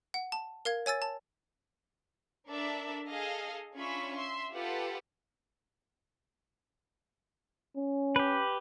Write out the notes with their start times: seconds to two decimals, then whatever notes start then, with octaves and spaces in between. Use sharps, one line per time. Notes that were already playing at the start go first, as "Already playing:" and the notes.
0.14 F#5
0.32 A5
0.65 A#4 F5 G#6
0.86 C#5 G#5 E6 A6
1.02 A5
2.49 D4 A4 A#4 D5 E5
3.08 G#4 A4 D#5 F5
3.76 C#4 D4 F4 E5 B5 C#6
4.16 E5 C6
4.54 F4 G4 A4 B4 F#5
7.77 C#4
8.16 G4 B4